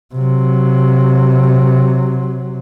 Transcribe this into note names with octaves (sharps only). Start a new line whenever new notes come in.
C3 F#3